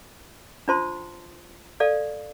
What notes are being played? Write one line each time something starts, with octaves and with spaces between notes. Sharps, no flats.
D4 F4 C5 A5 C6
A4 D5 F5